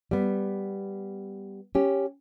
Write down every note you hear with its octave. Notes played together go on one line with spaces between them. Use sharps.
G3 B3
C#4 G4